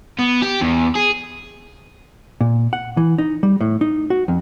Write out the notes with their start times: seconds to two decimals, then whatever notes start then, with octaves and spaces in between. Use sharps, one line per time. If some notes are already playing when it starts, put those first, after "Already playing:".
0.19 B3
0.43 G4
0.62 E2
0.95 G#4
2.41 A#2
2.73 F#5
2.97 E3
3.18 D#4
3.43 G3
3.61 A2
3.81 D#4
4.10 F#4
4.28 F2